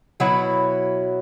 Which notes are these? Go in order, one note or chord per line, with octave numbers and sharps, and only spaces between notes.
B2 F#3 E4